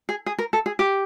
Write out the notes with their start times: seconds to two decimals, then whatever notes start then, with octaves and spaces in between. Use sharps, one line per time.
0.09 G#4
0.26 G#4
0.39 A#4
0.53 A4
0.66 G#4
0.79 G4